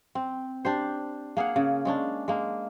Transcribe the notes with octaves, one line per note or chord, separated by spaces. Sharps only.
C4
D4 G4 C5
A#3 G#4 F5 F#5
C#3
G#3 C#4 D4
G#3 A#3